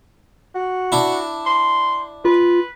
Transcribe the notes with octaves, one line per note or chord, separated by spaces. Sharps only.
F#4
D4 E4
C6
F4 B4